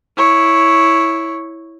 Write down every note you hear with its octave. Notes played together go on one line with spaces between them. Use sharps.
E4 C#5